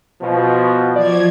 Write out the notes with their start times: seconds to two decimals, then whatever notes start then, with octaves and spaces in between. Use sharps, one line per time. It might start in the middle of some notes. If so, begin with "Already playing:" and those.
0.21 B2 F3
0.96 F3 D5 G#6